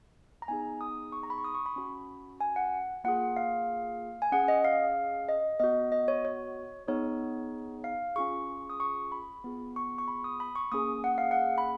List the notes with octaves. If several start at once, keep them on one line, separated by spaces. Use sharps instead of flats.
A#5
B3 D#4 G#4 G#5
D#6
C#6
A#5
B5
C#6
D#6
C#6
B5
C#4 F#4
G#5
F#5
A#3 F4 G#4 F#5
F5
G#5
C#4 G#4 F#5
D#5
F5
D#5
B3 F#4 D#5
D#5
C#5
C#5
B3 D#4 G#4 C#5
F5
C#4 F4 G#4 C#6
D#6
C#6
B5
B3 F4 G#4
C#6
C#6
B5
D#6
B5
C#6
A#3 C#4 G#4 D#6
F#5
F5
F#5
B5